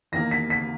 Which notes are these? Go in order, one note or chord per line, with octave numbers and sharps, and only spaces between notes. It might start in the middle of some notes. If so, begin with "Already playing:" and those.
E2 D#3 A#3 A#6
B6
B6